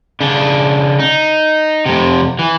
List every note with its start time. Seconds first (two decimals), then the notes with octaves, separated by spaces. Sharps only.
0.21 C#3 D4
0.99 D#4
1.86 F2 C3
2.39 E3